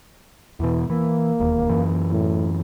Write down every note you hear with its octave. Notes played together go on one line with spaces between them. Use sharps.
E2 B2 E3
E3 A#3
E1 D#2
F#2 E3
A2